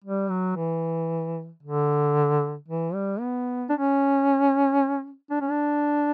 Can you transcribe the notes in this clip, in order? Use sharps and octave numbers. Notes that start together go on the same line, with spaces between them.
G3
F#3
E3
D3
E3
G3
B3
D4
C#4
D4
C#4
D4